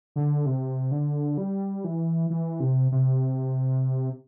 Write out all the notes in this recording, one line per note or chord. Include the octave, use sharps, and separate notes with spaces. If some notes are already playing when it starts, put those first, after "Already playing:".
D3
C3
D3
G3
E3
E3
C3
C3